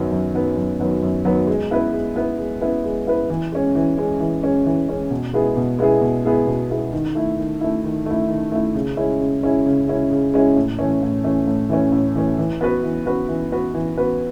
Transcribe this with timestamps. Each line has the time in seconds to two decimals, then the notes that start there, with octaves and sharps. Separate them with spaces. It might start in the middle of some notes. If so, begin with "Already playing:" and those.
Already playing: F#2 D#3 F#3 B3
0.11 F#2
0.34 D#3 F#3 B3
0.57 F#2
0.80 D#3 F#3 B3
1.02 F#2
1.25 D#3 F#3 B3
1.47 G#3
1.71 B3 E4 B4
1.93 G#3
2.16 B3 E4 B4
2.38 G#3
2.62 B3 E4 B4
2.84 G#3
3.07 B3 E4 B4
3.30 E3
3.52 G#3 C#4
3.75 E3
3.98 G#3 C#4
4.20 E3
4.42 G#3 C#4
4.66 E3
4.89 G#3 C#4
5.11 B2
5.33 G#3 B3 E4 G#4
5.57 B2
5.79 G#3 B3 E4 G#4
6.02 B2
6.25 G#3 B3 E4 G#4
6.47 B2
6.70 G#3 B3 E4 G#4
6.93 D#3
7.15 A3 E4
7.38 D#3
7.61 A3 E4
7.84 D#3
8.06 A3 E4
8.29 D#3
8.52 A3 E4
8.75 C#3
8.97 G#3 C#4 E4
9.21 C#3
9.43 G#3 C#4 E4
9.66 C#3
9.88 G#3 C#4 E4
10.11 C#3
10.34 G#3 C#4 E4
10.56 A2
10.79 E3 A3 C#4
11.02 A2
11.24 E3 A3 C#4
11.47 A2
11.69 E3 A3 C#4
11.92 A2
12.15 E3 A3 C#4
12.39 E3
12.61 B3 F#4 B4
12.84 E3
13.06 B3 F#4 B4
13.28 E3
13.52 B3 F#4 B4
13.74 E3
13.98 B3 F#4 B4